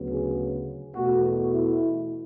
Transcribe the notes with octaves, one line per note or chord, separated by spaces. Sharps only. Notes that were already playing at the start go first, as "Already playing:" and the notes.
Already playing: D2 C#3 F#3 B3
G#4
E2 B2 A3 F#4
E4